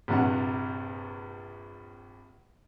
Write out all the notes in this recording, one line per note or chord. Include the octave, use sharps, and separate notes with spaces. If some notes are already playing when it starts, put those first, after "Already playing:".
A#1 G2 C3 F#5